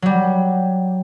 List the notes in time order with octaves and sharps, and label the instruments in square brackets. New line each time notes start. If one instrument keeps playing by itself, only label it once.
[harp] F#3 G3